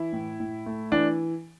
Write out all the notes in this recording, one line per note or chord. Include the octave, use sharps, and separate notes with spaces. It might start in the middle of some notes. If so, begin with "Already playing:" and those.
Already playing: E3 E4
A2
A2
A3
E3 D4